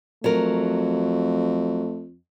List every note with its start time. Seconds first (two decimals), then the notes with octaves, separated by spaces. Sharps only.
0.24 F2 F#3 A3 A#4